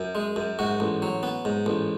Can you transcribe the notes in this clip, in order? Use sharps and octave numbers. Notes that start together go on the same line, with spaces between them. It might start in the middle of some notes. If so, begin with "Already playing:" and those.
Already playing: F#2
G#3
F#2
G#2 F#4
A1
F#3
B3
G#2
A1